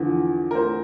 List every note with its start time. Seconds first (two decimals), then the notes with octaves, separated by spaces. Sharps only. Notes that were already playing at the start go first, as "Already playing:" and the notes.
Already playing: E2 D3 F3
0.51 A#4
0.55 C5